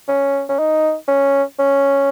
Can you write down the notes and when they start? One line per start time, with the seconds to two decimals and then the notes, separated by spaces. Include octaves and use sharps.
0.08 C#4
0.49 C#4
0.59 D#4
1.08 C#4
1.59 C#4